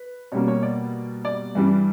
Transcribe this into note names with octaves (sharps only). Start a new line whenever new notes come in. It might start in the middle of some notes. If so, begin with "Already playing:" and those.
Already playing: B4
B2 G3 A#3 C#5
C#5
D5
D5
G2 E3 G3